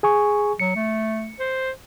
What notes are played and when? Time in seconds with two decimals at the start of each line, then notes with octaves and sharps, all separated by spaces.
0.03 G#4 G#5 C#6
0.60 F#3 C#7
0.76 A3
1.40 C5